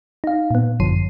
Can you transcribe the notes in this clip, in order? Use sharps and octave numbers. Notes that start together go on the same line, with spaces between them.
D#4 F5
A#2 B3
G#1 F#2 D3 F3 C7 D#7